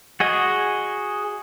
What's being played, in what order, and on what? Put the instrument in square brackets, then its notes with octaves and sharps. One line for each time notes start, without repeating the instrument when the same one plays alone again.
[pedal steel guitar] F#4 G#4 D#5